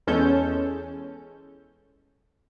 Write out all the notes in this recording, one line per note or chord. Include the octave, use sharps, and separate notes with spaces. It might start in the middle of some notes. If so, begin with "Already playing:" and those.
E2 G#3 C#4 A4 G6